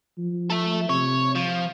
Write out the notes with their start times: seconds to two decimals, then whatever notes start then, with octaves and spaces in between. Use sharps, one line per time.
0.18 F3
0.50 A4 E5
0.89 C3 C#5
1.35 F3